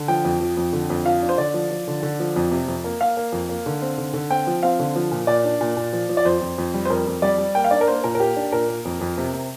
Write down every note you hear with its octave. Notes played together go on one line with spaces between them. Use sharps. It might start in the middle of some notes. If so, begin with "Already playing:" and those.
Already playing: D3
F3 G5
F2
F3
F2
D3
F2
F3 F5
D4
C5
D3 D5
F3
F3
D3
D3
F3
F2
C3
F2
A#3
A#3 F5
A#3
F2
A#3
D3
C4
D3
D3
C4 G5
F3
C4 F5
D3
F3
A#2
A#2 D5
D4
A#2
A#2
F3
F3
D5
F2 C5
F2
F2
G3
C5
F2 A#4
F2
G3 D5
G3
A#3 G5
F5
D4 D5
A#4
A#3 C5
A#2 A#4
A#4
A#3 G4
D4
A#2 A#4
A#3
F2
F2
C3
C3